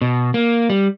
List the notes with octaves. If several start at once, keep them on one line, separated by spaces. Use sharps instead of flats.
B2
A#3
G3